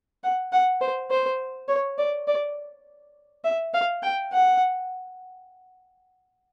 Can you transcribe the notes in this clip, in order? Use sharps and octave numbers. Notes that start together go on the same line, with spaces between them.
F#5
F#5
C5
C5
C#5
D5
D5
E5
F5
G5
F#5